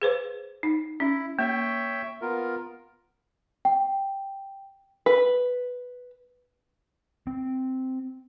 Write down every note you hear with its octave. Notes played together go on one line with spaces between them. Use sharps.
G#4 B4 C5
D#4
C#4 E4
A#3 C#5 E5 G5
B3 F4 A#4
G5
B4
C4